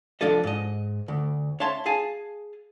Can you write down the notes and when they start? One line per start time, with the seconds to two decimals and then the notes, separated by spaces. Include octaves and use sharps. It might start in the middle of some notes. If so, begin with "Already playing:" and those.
0.21 C2 F3 D4 A4 D#5
0.44 G#2 D#5
1.08 D2
1.60 C#5 E5 F5 A5 C6
1.86 G#4 F5 G#5 A5